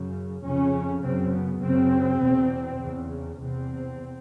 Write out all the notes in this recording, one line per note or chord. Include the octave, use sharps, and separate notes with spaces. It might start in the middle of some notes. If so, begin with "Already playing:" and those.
Already playing: F#2 C#3
F2 C#3 C#4
F#2 C#3 C4
B3
F#2 C#3 C4
E2 B2
E2 C#3
E2 C3 C4